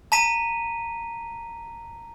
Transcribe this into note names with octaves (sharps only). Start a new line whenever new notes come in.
A5 A#5 B6 D#7